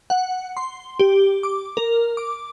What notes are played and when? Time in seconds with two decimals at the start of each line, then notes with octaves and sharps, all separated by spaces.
0.10 F#5
0.57 C6
0.99 G4
1.43 D6
1.77 A#4
2.17 D6